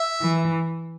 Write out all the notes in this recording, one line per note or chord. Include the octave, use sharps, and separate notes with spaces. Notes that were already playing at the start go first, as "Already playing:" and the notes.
Already playing: E5
E3